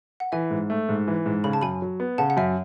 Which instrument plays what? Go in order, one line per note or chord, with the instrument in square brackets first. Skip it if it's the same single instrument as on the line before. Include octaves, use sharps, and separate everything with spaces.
[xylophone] F#5
[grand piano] E3 [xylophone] E5 G#5
[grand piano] G#2
A3
G#2
E3
G#2
[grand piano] C#3 [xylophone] B5
[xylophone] A5
[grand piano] F#2 [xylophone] G#5 B5
[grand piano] F#3
B3
[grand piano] C#3 [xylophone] F#5 A5
[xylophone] F#5
[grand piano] F#2 [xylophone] E5